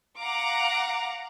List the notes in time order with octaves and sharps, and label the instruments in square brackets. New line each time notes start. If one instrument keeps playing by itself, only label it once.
[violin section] F5 F#5 A#5 D6